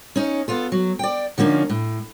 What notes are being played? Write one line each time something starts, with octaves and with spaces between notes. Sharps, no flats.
C#4 D#4
B3 F4 A4
F#3
D5 G5
D3 F3 A#3 C#4 D#4
A2